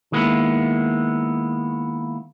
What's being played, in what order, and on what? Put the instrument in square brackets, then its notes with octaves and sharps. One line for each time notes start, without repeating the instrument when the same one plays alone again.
[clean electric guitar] D#3 G#3 A#3 B3 E4